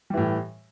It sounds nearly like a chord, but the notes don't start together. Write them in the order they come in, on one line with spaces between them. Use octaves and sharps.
G3 E3 A2